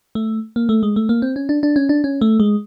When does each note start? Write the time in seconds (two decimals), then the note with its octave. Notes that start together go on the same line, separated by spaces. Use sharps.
0.15 A3
0.56 A#3
0.69 A3
0.83 G#3
0.96 A3
1.09 A#3
1.22 C4
1.36 C#4
1.49 D4
1.63 D4
1.76 C#4
1.89 D4
2.04 C#4
2.21 A3
2.40 G#3